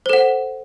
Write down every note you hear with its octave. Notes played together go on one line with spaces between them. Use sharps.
A4 C5 F#5